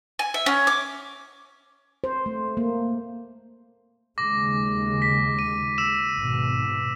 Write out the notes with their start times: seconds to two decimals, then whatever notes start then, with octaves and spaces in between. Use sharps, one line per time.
0.19 G#5
0.34 E5
0.46 C#4
0.67 D6
2.04 C5
2.26 A3
2.57 A#3
4.18 D#2 C#3 G#3 D6 A#6
5.02 B6
5.39 D#7
5.78 E6 E7
6.16 G#1 B2